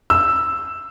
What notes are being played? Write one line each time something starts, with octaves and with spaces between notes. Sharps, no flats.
E6